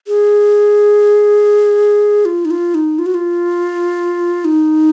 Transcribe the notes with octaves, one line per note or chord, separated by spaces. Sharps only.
G#4
F4
D#4
F4
D#4
F4
F#4
F4
D#4